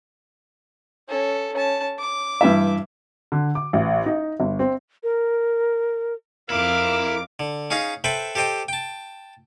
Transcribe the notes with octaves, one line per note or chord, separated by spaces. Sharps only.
C#4 A4
C#4 A5
D6
G2 E3 E5
D3
D6
A1
D#4
G1
C4
A#4
F2 E4 A#4 F5 D6
D3
C#4 D#4 G#4 F5 A#5
A4 B4 C5 E5 G5
G4 A4 C5 D#5 G5
G5 A5